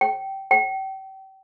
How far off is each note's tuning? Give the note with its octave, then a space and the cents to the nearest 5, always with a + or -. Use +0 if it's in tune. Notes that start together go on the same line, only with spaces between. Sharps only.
G5 -20
G5 -35